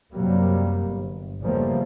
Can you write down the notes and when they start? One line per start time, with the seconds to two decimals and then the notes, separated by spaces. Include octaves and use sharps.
0.14 F#2 C3 F#3 G3 A#3
0.87 G1
1.42 E2 C#3 F3 G3 A3 A#3